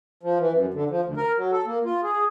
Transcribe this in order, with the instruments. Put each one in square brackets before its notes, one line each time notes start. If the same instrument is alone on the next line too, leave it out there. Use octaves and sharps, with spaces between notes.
[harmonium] F3
E3
F#2
D3
F3
D2
A#4
F#3
A4
A#3
F4
G#4